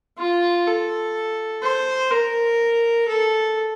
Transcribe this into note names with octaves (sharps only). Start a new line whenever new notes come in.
F4
A4
C5
A#4
A4